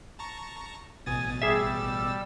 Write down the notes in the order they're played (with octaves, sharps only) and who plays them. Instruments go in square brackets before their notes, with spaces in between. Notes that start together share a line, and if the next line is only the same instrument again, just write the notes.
[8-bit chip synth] A5 A#5 C#6
[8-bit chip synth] A1 B2 A6 [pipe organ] G#5 D#6
[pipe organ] G3 E6 [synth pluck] G#4 E5